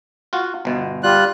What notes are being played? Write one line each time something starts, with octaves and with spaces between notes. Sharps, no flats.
F4 F#4
G1 B2
G3 F4 F#6